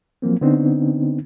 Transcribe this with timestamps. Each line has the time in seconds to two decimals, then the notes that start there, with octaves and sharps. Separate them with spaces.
0.22 F3 F#3 A#3 C4
0.41 D3 B3 C4 D4 D#4